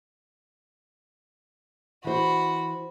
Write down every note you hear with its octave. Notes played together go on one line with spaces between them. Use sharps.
E3 F#4 C5 B5